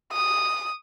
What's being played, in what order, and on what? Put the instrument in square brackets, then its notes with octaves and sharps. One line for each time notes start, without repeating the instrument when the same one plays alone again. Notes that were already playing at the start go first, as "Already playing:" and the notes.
[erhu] D#6